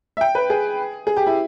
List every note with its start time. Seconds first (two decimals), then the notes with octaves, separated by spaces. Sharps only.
0.17 E5
0.21 G5
0.35 B4
0.50 G#4
1.07 G#4
1.17 G4
1.27 E4